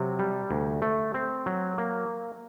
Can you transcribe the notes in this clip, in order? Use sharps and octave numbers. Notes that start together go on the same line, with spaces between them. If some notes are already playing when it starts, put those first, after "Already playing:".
Already playing: C3 F#3
G3
D2
A3
C4
F#3
A#3